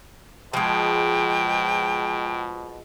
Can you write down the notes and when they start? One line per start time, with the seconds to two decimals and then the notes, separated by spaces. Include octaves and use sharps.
0.53 B2 F3 G#3 G5